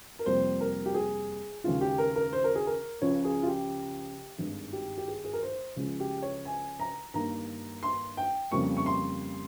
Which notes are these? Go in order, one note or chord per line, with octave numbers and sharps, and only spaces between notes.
A#4
F2 C3 G3 A#3 C5
A#4
G4
G#4
D#2 C#3 G#3 F4
G4
A#4
A#4
C5
A#4
G#4
A#4
C#2 C#3 F3 C#5
G#4
F4
G4
G#1 G2 D#3 G#3
G4
G4
G#4
G#4
A#4
C5
C#2 C#3 F3 G#3
G4
C#5
G#5
A#5
G2 D#3 A#3 A#5
C6
G5
F2 C#3 G3 A#3 C#6
C#6
C6